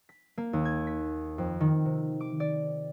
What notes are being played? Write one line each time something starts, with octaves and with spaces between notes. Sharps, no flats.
B6
A#3
D#2
G#6
B6
F2
D#3
C3
D6
D5